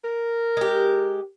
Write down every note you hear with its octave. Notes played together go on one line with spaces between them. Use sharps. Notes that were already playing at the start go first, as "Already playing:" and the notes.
A#4
G#3 G4